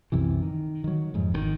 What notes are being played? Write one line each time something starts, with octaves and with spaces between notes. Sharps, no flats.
C2 F#2 C3 E3
D#3
D#3 F#3
F2 G#2
G#1 C3 D#3